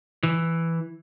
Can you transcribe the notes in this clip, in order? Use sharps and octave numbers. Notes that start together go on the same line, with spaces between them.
E3